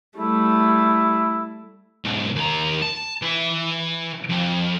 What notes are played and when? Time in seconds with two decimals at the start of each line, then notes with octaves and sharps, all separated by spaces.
0.18 G3 A3 E4
2.04 B1 G#2
2.36 D#2 A#5
2.82 A5
3.22 E3 E5
4.30 F2